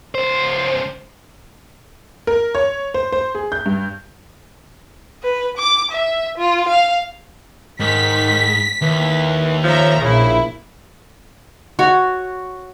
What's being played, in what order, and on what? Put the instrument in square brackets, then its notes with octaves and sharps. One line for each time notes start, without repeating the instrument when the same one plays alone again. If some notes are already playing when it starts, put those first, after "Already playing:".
[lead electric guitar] C#2 C5
[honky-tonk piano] A#4
C#5
C5
C5
G#4
G6
G2
[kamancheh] B4
D6
E5
F4
F5
[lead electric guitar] G#2 [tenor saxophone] D#3 [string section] B6
[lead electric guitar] D#2 [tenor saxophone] E3
[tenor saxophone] F3 [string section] C#5 E5 A#5
[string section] A#1 E4 [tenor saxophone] C#3
[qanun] F#4 C#5